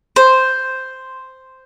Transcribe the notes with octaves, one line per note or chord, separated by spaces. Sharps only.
C5